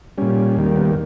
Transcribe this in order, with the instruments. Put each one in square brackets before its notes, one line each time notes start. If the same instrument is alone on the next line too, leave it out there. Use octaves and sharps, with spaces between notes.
[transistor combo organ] A#2 G3 C#4
D#2 D#3 G3
A#3
B3
A#3